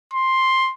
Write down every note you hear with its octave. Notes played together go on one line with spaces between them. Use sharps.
C6